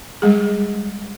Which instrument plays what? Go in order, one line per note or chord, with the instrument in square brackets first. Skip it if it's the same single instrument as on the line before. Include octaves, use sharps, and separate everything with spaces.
[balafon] G3 G#3 G#4